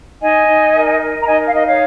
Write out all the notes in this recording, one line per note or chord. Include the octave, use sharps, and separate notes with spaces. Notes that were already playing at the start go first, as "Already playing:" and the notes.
D#4 D#5 G#5
D#4
A#4
A#4
A#5
D#4 D#5 G#5
F5
D#4 D#5
C#5 F5